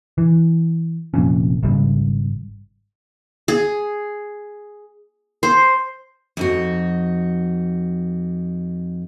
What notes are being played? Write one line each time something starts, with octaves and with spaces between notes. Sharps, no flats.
E3
F1 F2 A#2 C#4
G#1 G#2 C#3 G3
G#4
C5
F2 D#4 F#4